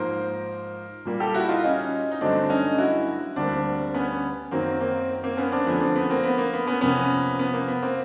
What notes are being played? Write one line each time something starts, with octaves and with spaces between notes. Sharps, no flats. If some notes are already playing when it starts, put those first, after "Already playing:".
Already playing: G#2 F3 A#3 A#4 C5
A#2 G3 A#3
G4 A4
E4 F#4
D#4 F4
C#4 D#4
D#4
G2 D3 F#3 A3 C4 D4
C#4 D#4
E4 F#4
D2 D3 G3 A#3 C4 D4
B3 C#4
F#2 D#3 F#3 A#3 C4
A#3 C4
A#3 C4
B3 C#4
C4 D4
F2 D3 F3 A3 B3 C#4
C4 D4
B3
A#3 C4
B3
A#3
B3
B3 C#4
F2 C3 F3 A#3 B3 C#4
B3
A#3
B3
A#3 C4